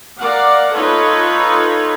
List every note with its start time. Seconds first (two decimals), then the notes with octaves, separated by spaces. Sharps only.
0.19 A#4 D5 F5 F#5
0.74 D#4 F4 A4 B4 C#5